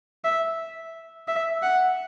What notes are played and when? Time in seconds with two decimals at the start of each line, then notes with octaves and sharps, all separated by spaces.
0.24 E5
1.28 E5
1.62 F#5